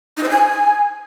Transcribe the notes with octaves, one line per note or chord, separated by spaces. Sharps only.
D#4
C5
G#5